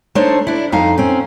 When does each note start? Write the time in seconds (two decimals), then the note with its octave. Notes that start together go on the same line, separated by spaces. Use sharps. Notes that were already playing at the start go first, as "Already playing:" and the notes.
0.15 A3 D4 D#4 C5 C#5
0.47 D4 E4
0.72 F2 D#4 F5
0.98 C4 C#4